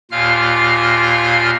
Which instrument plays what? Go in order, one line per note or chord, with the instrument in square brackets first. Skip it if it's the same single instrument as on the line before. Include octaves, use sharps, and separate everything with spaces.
[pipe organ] D#2 A#2 F4 F5 F6